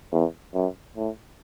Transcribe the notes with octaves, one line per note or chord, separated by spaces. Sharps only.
E2
F#2
A2